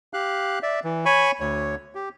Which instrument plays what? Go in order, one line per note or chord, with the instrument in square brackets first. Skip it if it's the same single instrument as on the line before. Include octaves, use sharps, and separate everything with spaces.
[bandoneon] G4 F5 F#6
D5 E5
E3
C#5 G#5 B5 C#6
D2 C#5
G4